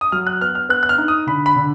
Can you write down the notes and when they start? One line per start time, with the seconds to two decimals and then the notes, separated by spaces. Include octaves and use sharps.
0.01 D#6
0.12 F#3 F6
0.27 F#6
0.41 B3 F6
0.55 F6
0.69 B3 F#6
0.83 F#6
0.89 F6
0.98 D#4
1.08 D#6
1.27 D3 B5
1.46 B5
1.56 D3